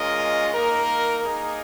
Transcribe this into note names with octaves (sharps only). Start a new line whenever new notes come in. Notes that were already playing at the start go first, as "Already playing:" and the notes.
Already playing: G#3 C#4 F4 A#4 D#5
A#3 D#4 A#4
A#3 D#4 G#4